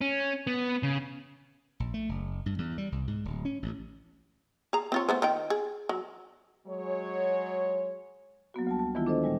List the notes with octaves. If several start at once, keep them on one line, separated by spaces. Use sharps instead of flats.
C#4
B3
C#3
A#1
A3
F#1
G2
E2
G3
C2
G#2
D1
C#4
A1
G#4 A#5
C4 F4 C#5
A3 B3 C5
D#3 F4 G5
G#4
F#3
F#3 G#3 C#5
F#3 A#3 B3 F#4
D2 G3 A5
A5
D#3 E3 G#3 B3 E4 F4
D4 A4 C5 D#5
A#2 G3 G#3